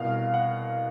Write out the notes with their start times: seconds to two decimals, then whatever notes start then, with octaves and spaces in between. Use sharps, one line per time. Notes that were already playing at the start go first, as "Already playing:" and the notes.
Already playing: C2 B2 F5
0.34 F#5